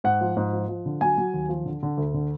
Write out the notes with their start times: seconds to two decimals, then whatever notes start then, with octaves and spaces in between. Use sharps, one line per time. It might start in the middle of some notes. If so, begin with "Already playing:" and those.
0.04 G#2 F#5
0.21 F3
0.37 G#2
0.53 F3
0.68 F3
0.86 D3
1.01 F#3 G#5
1.18 F#3
1.34 D#2
1.49 F3
1.65 D3
1.83 D3
1.98 D2
2.14 D3